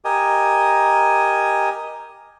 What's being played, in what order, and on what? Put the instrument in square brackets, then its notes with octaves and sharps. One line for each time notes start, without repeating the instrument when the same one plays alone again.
[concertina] G4 A#4 D#5 G#5